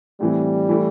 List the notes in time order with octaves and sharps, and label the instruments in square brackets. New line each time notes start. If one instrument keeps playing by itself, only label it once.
[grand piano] A2 E3 C4 [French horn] G3
[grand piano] E3 A3 E4